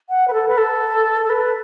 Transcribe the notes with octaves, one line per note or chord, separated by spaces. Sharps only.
F#5
B4
A4
B4
A4
A4
B4